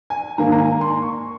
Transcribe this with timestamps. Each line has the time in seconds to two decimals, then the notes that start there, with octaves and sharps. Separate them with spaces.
0.10 G#5
0.38 G#2 D#3 A#3 A#5
0.52 A#5
0.59 G#5
0.81 C6
1.02 C#6